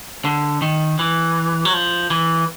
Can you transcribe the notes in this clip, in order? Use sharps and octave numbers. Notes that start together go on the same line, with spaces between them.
D3
D#3
E3
F#3
F3
E3